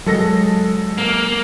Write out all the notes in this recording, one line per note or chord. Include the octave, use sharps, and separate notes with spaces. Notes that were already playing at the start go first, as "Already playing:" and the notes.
F#3 G#3 A4 A#6
A#3